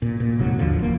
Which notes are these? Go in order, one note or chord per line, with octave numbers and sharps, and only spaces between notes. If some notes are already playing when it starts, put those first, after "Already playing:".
A#2
A#2
E1 G#2 C3 F#3
A1 D#2 D3 F3
F1 A#3